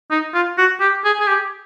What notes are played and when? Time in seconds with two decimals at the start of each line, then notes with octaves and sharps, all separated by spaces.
0.10 D#4
0.34 F4
0.58 F#4
0.80 G4
1.05 G#4
1.20 G#4
1.27 G4